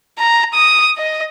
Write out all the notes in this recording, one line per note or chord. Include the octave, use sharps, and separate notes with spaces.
A#5
D#6
D#5